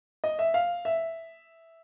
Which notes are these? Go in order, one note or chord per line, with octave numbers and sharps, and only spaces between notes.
D#5
E5
F5
E5